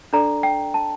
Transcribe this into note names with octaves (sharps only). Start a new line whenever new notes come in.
D4 A4 D5 A#5
G5
A5